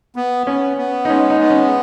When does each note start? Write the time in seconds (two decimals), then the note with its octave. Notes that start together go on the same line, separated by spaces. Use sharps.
0.16 B3
0.47 B3 C#4
0.77 B3
1.05 D#4
1.10 G#3 C#4
1.30 D#4
1.41 B3
1.50 C#4